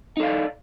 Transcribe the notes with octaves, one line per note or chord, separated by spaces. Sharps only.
D#4 A4 D5 F5